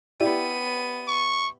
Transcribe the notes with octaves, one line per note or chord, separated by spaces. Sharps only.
B3 E4 G4 D5 D#7
C#6